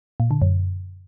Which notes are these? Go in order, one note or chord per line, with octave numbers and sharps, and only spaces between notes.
A#2
D3
F#2